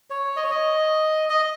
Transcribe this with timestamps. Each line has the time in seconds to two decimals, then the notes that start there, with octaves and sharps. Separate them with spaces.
0.10 C#5
0.36 D#5
0.44 C#5
0.51 D#5
1.30 D#5